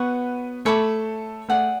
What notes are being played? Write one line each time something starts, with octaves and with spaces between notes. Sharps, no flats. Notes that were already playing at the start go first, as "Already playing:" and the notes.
Already playing: B3 F#4 B4 C#5 F#5
A3 A4 C#5 E5 B5 D6
A3 G#4 A4 D5 F#5